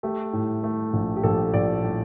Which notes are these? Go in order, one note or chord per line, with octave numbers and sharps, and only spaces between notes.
A3 G4
A2
A3
A#1
G4
A#1 A4
A#1 D5
A2